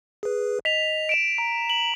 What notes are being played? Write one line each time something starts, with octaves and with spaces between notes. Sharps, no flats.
G#4 B4
D#5 B6 F7
D7 E7
A#5
F#7